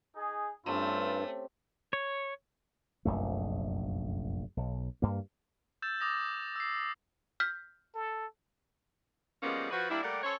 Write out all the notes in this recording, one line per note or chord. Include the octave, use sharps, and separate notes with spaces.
D#4 G#4
G2 A3 C4 C#4 E4 F4 G4
C#5
F1 A#1 F#2 A3
B1
G2 A#3
E6 G6 A6 E7
D6 D#6 A#6
D6
E6 C7
F6 G6 B6
A4
F3 G3 G#3 A#3 B3 C#4
F3 F#4 B4
G3 A#3 D4 E4
G3 A3 A#3 G4 D5 F#5
C#4 A4 C5 C#5